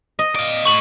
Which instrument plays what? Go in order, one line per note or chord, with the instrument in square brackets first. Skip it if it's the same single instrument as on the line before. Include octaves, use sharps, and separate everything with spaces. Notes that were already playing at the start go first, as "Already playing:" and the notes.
[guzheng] D#5
[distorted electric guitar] D5 F5
[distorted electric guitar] A2 [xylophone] C#6 F#7